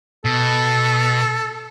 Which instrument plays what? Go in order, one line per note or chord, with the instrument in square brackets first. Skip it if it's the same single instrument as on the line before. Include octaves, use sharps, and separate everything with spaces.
[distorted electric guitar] B2 [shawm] A4